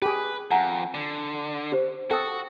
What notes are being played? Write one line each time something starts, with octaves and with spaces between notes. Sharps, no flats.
G4 G#4 B4
F2 F#5 G#5 A#5
D3
G4 C5
F#4 A4 G5 D#6